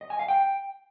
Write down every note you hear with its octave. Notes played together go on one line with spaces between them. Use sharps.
D#5
G#5
F5
G5